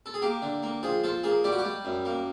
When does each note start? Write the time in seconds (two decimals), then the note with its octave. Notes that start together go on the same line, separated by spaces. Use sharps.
0.06 A4
0.14 G#4
0.22 A#3 G4
0.42 D3
0.63 A#3
0.83 F3 G#4
1.04 F3 A4
1.24 A#3 G#4
1.44 G3 G4
1.52 F#4
1.59 G4
1.65 G3
1.85 F#2
2.05 A#3